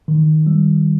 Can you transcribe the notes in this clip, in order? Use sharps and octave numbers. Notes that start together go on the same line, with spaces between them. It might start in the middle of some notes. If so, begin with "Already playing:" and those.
D#3
G3